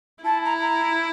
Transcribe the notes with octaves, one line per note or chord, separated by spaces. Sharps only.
E4 A5
A#5
A#5